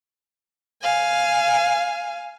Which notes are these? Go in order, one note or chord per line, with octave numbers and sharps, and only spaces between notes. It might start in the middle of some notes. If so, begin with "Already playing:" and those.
F5 G#5